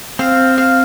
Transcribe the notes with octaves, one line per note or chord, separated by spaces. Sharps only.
C4 F5
F5